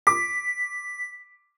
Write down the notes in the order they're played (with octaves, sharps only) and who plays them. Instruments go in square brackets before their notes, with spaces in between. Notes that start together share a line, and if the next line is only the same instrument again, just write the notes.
[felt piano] D6 [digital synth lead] B6